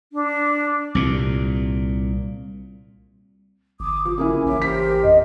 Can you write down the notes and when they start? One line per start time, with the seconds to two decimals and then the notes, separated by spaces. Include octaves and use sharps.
0.13 D4
0.95 C2 A#2
3.80 G1 D6 D#6
4.05 F3 D6
4.18 C#3 A#3 E4 G#5
4.46 A1 C#5 E5 D6
4.62 G4 A#4 C5 B6
5.04 F2 D#5